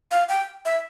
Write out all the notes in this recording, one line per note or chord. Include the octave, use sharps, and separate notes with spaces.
F5
G5
E5